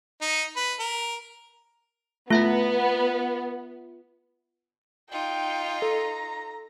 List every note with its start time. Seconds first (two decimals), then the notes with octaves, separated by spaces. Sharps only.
0.22 D#4
0.57 B4
0.80 A#4
2.31 A3 B3 F4 E5 F#5
5.12 D#4 F4 G5
5.82 A4 A#5